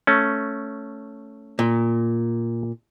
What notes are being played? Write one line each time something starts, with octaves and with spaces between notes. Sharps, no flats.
A3 C#4
A#2